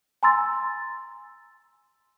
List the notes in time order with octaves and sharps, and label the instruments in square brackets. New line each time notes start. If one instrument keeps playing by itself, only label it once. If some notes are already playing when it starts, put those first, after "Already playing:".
[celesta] G#5 A#5 C6 E6 A6